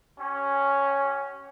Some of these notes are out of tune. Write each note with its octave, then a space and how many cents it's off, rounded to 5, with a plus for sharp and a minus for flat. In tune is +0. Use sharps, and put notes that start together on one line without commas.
C#4 +0 G4 -35